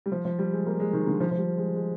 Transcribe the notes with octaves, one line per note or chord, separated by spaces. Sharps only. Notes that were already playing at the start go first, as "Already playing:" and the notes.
G3
F3
F3
G3
G#3
A#3
G#3
D#3
D3
F3
F3
G3
G#3
G#3